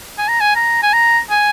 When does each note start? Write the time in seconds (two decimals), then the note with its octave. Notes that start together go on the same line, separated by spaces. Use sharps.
0.18 G#5
0.28 A#5
0.41 G#5
0.55 A#5
0.82 G#5
0.93 A#5
1.30 G#5